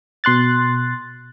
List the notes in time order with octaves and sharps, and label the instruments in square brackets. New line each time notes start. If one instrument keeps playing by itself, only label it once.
[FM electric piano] B2 C6 F#6 A6